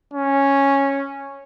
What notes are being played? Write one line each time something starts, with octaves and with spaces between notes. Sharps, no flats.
C#4